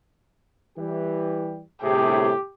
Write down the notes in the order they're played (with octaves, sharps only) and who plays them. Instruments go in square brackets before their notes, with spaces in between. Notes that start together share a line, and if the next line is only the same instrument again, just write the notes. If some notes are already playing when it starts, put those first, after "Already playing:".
[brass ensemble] E3 G3 G4
[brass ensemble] G1 A2 [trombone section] C3 G#4 [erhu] G4